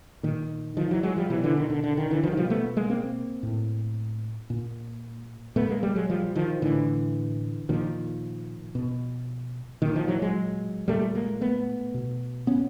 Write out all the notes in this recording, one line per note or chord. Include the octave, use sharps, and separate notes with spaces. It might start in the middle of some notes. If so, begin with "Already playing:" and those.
A#2 D#3
D#3 F3
E3 F#3
F#3 G#3
F3 G3
B2 E3 F#3
D3 E3
D#3
D3
D3
D#3
D3 E3
D#3 F3
F#3
B2 F3 G3
A3 B3
G#3 A#3
A#3 C4
A2
A#2
A#2 A3 B3
G#3 A#3
G3 A3
F#3 G#3
F3 G3
D#3 F3
A2 D3 E3
A#2 D#3 F3
B2
A#2 D#3
D#3 F3
E3 F#3
F#3 G#3
A#2 G3 A3
G#3 A#3
A3 B3
B2
B3 C#4